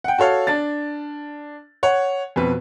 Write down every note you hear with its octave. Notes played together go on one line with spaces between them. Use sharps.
F#5 G5
F#4 A4 C#5 F5
D4 A6
C#5 F#5
F2 B2 B4